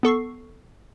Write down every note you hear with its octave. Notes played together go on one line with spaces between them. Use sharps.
B3 A4 C#6 C7